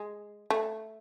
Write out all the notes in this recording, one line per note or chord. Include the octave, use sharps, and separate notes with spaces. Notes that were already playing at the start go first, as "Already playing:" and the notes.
Already playing: G#3
A3